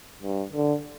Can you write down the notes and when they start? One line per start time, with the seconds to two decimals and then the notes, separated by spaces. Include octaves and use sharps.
0.22 G2
0.53 D3